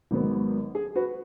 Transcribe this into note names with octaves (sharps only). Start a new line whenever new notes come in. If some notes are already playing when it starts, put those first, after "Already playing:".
G#1 G#2 F#3 B3
G#4
F#4 B4